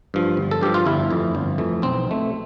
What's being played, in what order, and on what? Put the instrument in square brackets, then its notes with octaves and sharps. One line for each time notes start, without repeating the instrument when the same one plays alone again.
[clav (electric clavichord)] G2 F3
G1
A4
G2 F3 G4
F4
G1 E4
F2 E3 A3
G1
F2 E3 A3
B1 C4
B2 A3